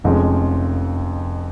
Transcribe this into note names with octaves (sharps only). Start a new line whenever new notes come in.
F1 F2 F3 G#3 C#4